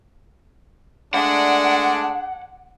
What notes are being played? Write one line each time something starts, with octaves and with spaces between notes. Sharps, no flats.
G#3 A3 D4 F#5